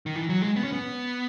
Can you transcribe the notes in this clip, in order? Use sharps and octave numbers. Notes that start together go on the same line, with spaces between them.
D#3
E3
F#3
G#3
B3
C#4
B3